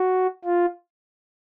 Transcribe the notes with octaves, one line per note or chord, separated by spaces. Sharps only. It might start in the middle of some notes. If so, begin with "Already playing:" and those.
Already playing: F#4
F4